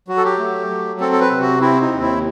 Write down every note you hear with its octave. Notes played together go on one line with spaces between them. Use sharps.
F#3 F#4
A4
G4
A3
F#3
C4 A4
A4
B4
C3
F#4
C4 E4
D#4
D#2
E4